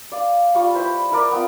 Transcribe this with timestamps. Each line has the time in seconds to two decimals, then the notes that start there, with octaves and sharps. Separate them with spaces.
0.12 D5 F5
0.55 G3 F4 D5 C#6
0.75 E4 B4 C5
1.11 E4 A#4 D5
1.32 B3 C4 F4